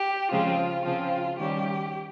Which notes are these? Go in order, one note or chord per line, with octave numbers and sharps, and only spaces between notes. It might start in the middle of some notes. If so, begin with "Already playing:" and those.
Already playing: G4
C#3 F3 G#3 C4 F4
C#3 F3 C4 F4
D#3 G3 C#4 G4